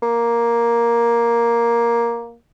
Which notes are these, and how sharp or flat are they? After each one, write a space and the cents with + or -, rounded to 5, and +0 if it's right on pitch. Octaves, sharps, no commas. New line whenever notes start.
A#3 +5